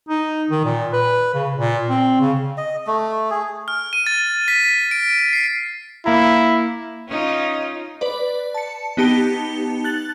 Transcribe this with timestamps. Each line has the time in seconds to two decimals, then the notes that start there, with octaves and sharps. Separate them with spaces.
0.09 D#4
0.50 D#3
0.65 A#2
0.93 B4
1.34 C#3
1.56 A#2
1.89 C4
2.21 C#3
2.57 D#5
2.87 A3
3.30 G#4
3.68 F6
3.93 D#7
4.07 A6
4.48 B6
4.91 D7
5.33 C7
6.06 A#3 E4 F5 A#5
7.08 C#4 D#4 F4
8.01 B4 D5
8.54 A5 C#7
8.97 B3 D#4 G4 A5 C#7 G7
9.84 F#6 A6 F#7